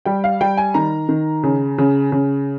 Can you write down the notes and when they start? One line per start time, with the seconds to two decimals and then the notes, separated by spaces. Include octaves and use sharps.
0.05 G3 G5
0.24 F5
0.41 G3 G5
0.57 G#5
0.74 D#3 A#5
1.09 D#3
1.43 C#3
1.78 C#3
2.12 C#3